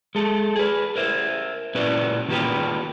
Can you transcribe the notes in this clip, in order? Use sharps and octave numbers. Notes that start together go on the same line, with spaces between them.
G#3 A4
G#4 B4
A#4 C5 E5
A#2 C#4 E4 B4 D5
D#3 A#3 F4 G4 B4